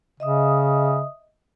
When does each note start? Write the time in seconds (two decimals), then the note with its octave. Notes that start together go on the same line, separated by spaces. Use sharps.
0.20 C#3 D#5 E5 D#6